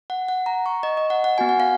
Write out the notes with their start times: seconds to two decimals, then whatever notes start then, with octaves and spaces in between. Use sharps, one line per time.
0.10 F#5
0.28 F#5
0.46 A#5
0.66 C#6
0.83 D#5
0.97 D#5
1.10 F#5
1.24 F#5
1.38 B3 F#4 G#5
1.49 F#5
1.60 F5